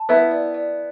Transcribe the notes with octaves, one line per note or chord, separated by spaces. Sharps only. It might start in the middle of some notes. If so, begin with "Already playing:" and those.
Already playing: A5
B3 E4 B5
D5
D5